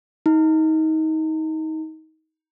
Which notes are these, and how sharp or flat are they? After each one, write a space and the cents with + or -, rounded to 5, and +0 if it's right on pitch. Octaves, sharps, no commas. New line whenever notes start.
D#4 +25